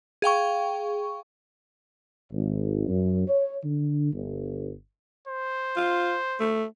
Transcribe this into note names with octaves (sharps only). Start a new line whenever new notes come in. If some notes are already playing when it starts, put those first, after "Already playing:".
G#4 F5 G5 C#6
G#1
F#2
C#5
D3
G1
C5
F4
A3